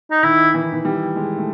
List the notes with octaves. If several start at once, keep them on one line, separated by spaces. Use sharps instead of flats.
D#4
D#3 E4
E3
D#3
E3
G3
G#3
A3